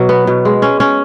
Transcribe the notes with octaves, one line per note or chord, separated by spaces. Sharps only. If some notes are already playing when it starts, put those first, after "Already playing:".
Already playing: B2 F#3
B3
B2
G#3
C#4
C#4